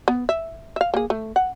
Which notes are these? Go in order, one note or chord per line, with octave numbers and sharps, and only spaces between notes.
B3
E5
E5 F5
A#3 G#4
A3
F#5